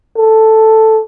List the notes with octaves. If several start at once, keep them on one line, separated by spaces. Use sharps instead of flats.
A4